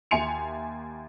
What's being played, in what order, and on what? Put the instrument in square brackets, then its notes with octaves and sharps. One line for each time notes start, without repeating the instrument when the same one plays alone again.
[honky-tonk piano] D#2 E5 G#5 C6 C#7 F7